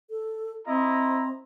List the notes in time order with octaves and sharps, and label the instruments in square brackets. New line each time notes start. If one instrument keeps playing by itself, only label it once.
[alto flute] A4
[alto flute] C4 [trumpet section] E4 D#5 A#5